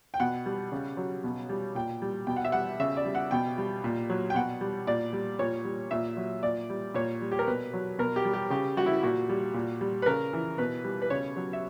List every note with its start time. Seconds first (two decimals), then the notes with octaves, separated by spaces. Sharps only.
0.14 G5
0.20 B2 F#5
0.46 G3
0.72 C#3
0.97 F#3
1.24 B2
1.49 G3
1.75 A#2 G5
2.02 G3
2.27 B2 G5
2.36 F#5
2.45 E5
2.52 G3 F#5
2.79 C#3 E5
2.97 D5
3.05 G3
3.15 F#5
3.31 B2 G5
3.58 G3
3.84 A#2
4.10 F#3
4.30 G5
4.35 B2 F#5
4.61 G3
4.87 A#2 D5
5.13 G3
5.39 A#2 C#5
5.65 G3
5.91 A#2 E5
6.17 F#3
6.43 A#2 D5
6.70 G3
6.94 A#2 C#5
7.22 G3
7.32 G4
7.39 A#4
7.47 B2 B4
7.73 F#3
7.99 B2 A#4
8.16 G4
8.25 G3
8.34 G4
8.50 C#3 G4
8.77 G3 F#4
8.86 E4
9.03 A#2 F#4
9.29 G3
9.54 A#2
9.81 G3
10.02 B4
10.06 C#3 A#4
10.33 E3
10.58 B2 B4
10.84 G3
11.02 B4
11.10 C#3 C#5
11.37 F#3
11.53 E5